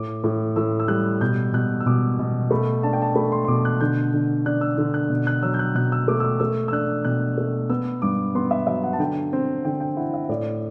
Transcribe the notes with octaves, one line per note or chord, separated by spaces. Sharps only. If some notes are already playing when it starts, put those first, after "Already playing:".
Already playing: A2 D6
A2
A2 E6
E6
G3 F#6
B2 G6
B2 F#6
E6
B2 D6
B2
A3 B5
D4 A5
G5
A5
A3 B5
C6
C6
B2 D6
F#6
D3 G6
D3
D4 F#6
E6
D3
F#6
B2
F#6
F#3 E6
G6
F#6
B2 F#6
E6
A3 D6
E6
D6
A3 E6
E6
D4 F#6
B2 F#6
A3
B3 E6
G2 D6
B3 C6
E5
F#3 E5
F#5
A5
D3 G5
C4
D3 G5
G5
E4 F#5
E5
A2 D5